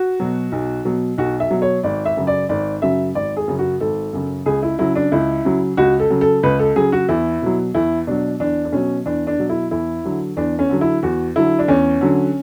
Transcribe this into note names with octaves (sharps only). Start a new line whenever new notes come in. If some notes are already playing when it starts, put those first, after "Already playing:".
Already playing: F#4
B2 F#3
B1
B2 F#3
B1 F#4
E5
B2 F#3
C#5
G#1 D5
E5
F#2 C#3 F#3
D5
G#1 D5
F#2 C#3 F#3 E5
G#1 D5
G#4
F#2 C#3 F#3
F#4
G#1 A4
F#2 C#3 F#3
C#2 G#4
E4
C#3 F#3 E4
D4
C#2 E4
C#3 F#3
C#2 F#4
A4
C#3 F#3
A4
C#2 B4
A4
C#3 F#3 G#4
F#4
E2 E4
B2 F#3
E2 E4
B2 F#3 D4
E2 D4
D4
B2 F#3 C#4
E2 D4
D4
B2 F#3
E4
E2 E4
D3 F#3
E2 D4
C#4
D3 F#3
E4
E2 F#4
D3 F#3 E4
D4
E2 C#4
D3 F#3